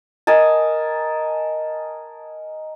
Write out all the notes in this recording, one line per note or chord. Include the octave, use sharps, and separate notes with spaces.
A#4 D#5 G#5 A5